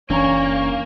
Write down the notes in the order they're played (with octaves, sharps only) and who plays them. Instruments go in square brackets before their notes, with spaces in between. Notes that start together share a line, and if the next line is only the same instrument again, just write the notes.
[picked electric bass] F#1 E3 C#4 [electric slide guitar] A#3 [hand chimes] D4 G#5 A#5 [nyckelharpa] C#5